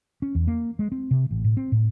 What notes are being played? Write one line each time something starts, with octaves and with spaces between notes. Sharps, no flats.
C#4
E2
A#3
G#3
C4
C3
A1
A2
C4
A2